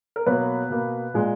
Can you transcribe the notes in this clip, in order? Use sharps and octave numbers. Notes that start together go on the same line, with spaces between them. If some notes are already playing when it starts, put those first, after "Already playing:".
A#4
B2 F#3 A#3 B3 B4
B2 A#3
A#2 G#3